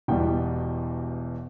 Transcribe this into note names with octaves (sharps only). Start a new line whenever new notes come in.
E1 E2 B2 G3 G5